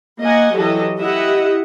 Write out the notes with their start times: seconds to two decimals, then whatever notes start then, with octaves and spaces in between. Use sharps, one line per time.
0.21 A#3 D#5 F#5 G#5
0.55 E3 F#3 G4 A4 D#5
0.98 E4 G4 D#5 E5 F#5